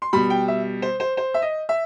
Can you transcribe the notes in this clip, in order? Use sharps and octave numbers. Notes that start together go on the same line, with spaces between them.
C6
B2 G3 B5
G5
E5
C5
C5
C5
E5
D#5
E5